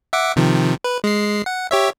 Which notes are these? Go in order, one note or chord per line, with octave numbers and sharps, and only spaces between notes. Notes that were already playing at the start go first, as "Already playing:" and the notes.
E5 F#5 D6
C3 D#3 F3
B4
G#3 C7
F#5
G4 C#5 E5